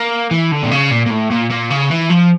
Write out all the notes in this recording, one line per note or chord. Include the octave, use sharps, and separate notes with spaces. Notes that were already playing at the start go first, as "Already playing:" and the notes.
Already playing: A#3
E3
D3
A#2
C#3
A#2
A#2
A2
A#2
A#2
C#3
E3
F3